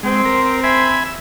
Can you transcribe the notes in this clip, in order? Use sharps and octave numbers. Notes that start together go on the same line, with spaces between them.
G#3 C4
A#4
E5 G#5 B5
E6